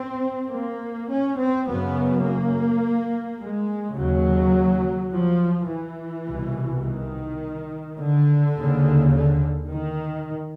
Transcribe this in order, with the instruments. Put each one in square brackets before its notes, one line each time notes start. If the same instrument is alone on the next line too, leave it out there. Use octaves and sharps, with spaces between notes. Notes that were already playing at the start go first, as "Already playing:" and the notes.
Already playing: [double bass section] C4
A#3
C#4
C4
F#2 C#3 B3
A#3
G#3
D#2 C#3 F#3
F3
E3
C2 B2
D#3
D3
D#2 C#3
D3
D#3